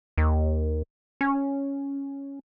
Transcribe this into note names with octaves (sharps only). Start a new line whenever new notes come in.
D#2
C#4